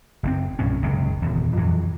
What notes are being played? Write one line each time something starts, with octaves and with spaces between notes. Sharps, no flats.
F#1 C#3 C4
B1 G2 A#2 C#4
F#1 C#2 F#2 C3
D#1 E2
F2 E3 F#3